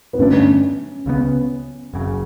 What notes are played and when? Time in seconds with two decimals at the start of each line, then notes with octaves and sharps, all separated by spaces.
0.13 B3
0.19 G2 D3 A3 C#4 D4
1.06 C#2 C#3 F#3 B3
1.94 F#1 F#2 C#3